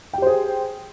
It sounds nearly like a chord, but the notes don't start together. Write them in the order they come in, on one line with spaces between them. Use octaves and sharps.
G5 G4 C5 G#4